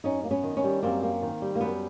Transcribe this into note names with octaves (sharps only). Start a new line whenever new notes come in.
F#2 C#4 D#4
A#3
B3 C#4
D#3
B3 C#4
G3
F#2 A#3 C4
A#3
D#3
G3
A#3
F#2 B3